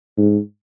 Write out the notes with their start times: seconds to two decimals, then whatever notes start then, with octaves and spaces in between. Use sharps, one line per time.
0.17 G#2